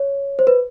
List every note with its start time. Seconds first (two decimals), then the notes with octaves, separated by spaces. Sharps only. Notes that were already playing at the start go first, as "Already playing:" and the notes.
Already playing: C#5
0.39 C5
0.47 B4